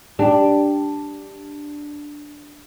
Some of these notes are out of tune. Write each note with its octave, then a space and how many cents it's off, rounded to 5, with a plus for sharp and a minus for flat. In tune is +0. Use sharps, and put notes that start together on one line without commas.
D4 +0 G4 +0